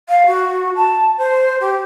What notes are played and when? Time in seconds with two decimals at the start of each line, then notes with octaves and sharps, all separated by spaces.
0.09 F5
0.26 F#4
0.76 A5
1.18 C5
1.60 G4